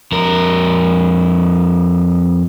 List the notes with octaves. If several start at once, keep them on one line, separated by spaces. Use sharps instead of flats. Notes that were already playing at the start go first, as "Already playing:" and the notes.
F2 A#4